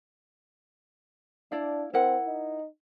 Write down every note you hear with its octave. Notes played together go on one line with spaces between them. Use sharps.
D4 E4 D5 F5
C4 E4 A#4 F#5
D#4